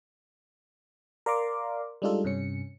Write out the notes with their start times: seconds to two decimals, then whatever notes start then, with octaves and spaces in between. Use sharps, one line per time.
1.26 A#4 D5 F5 A#5 C6 D6
2.02 G3 G#3 D4 D#4 F4 A4
2.24 G2 C3 C#4 C#7